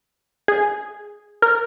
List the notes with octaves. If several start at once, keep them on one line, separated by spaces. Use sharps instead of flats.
G#4
A#4